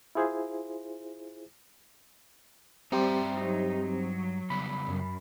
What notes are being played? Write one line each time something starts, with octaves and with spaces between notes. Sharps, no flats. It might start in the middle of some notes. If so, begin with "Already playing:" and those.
E4 F4 G#4 C5
G2 G3 C4 G4 C5 E5 A#5
F#3 D#4
F#3
C#3 G3 B3 B5
F#2